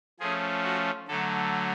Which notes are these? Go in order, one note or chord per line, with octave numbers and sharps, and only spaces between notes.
F3 A3 C#4 G#4
F#4
D3 F#3 A3 A4